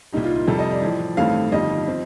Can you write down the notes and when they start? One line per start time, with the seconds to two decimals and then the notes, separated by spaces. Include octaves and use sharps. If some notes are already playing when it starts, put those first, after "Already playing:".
0.13 C2 A#2 G3 D#4
0.24 F4
0.36 F4
0.47 F2 C3 G3 A4
0.59 D#5
0.71 D5
0.82 A1 A2 F3
1.17 A1 G2 D#3 A3 C4 F5
1.52 G1 F2 D#3 G3 D#5
1.87 F3 C4